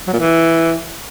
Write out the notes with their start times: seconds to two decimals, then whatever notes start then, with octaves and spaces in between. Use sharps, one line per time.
0.07 F#3
0.13 A#2
0.19 E3